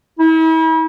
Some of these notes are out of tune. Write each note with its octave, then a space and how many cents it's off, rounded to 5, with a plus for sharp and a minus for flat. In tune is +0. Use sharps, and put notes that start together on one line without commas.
E4 -40